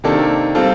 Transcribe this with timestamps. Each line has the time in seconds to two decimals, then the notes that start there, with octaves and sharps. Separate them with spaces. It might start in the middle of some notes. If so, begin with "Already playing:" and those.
0.04 C3 D#3 A#3 D4 A4
0.55 C3 G3 C4 F4 A4